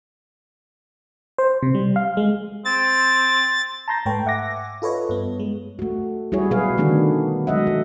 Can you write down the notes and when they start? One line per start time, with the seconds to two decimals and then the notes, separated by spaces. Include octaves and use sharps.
1.38 C5
1.63 C3
1.75 G3
1.96 F5
2.17 G#3
2.65 C4 A6
3.88 A5 A#5 C6 G6 A#6
4.06 G#2 A3 B4 C#5 G5
4.26 E5 F#5 G#5 D6 A#6
4.82 F4 A4 B4 C#5 D#5
5.09 G2 B3
5.39 G#3
5.79 A3 F#4
6.32 G3 E4 F#4 G#4 C#5
6.51 B2 F#3 G#4 B4 F5
6.77 D3 D#3 A3 B3 D4 F#4
7.47 F#3 G#3 D#5 E5 F#5
7.67 A4